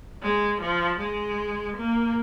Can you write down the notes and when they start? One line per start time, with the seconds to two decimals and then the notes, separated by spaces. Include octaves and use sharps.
0.22 G#3
0.61 F3
1.00 G#3
1.77 A#3